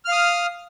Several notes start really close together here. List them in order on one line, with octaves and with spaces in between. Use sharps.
F6 F5 D#6